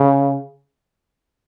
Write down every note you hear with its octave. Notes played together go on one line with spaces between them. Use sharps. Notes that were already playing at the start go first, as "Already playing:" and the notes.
Already playing: C#3